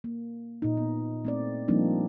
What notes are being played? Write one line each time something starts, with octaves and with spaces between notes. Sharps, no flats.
A#3
A#2 D#4
B3
A3 C4 D5
F3 G3 A#3 C4 D4 D#4